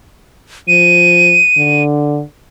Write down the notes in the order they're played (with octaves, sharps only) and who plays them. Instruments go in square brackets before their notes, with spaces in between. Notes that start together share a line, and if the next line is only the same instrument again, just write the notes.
[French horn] F3 [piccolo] D#7
[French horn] D3